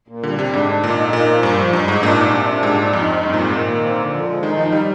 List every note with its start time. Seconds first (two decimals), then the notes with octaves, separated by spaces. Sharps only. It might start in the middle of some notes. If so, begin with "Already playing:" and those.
0.08 A#2
0.23 D3 G3
0.39 C3 G3
0.53 G#2 D4
0.68 D3
0.83 A#2 D#4
0.98 D#4
1.13 A#2 A#3
1.28 F3
1.43 G2 A#3
1.58 F3
1.73 G2 D#4
1.88 G#2 D#4
2.03 A#2 D4
2.18 D4
2.33 C3
2.48 D4
2.63 G#2 G3
2.78 G3
2.93 F2 D#4
3.08 C4
3.23 G2 C4
3.34 A#2
3.38 C4
3.43 G#2
3.53 A#2 D#3
3.68 A#3
3.83 C4
3.98 D3
4.13 F3
4.28 G#3
4.43 D#3 D#4
4.58 F3 D#4
4.72 G3 D#4